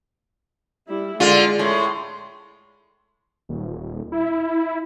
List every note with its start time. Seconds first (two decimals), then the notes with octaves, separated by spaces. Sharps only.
0.88 G3 E4
1.20 D3 G#3 F4
1.59 A2 C6
3.49 D#1
4.12 E4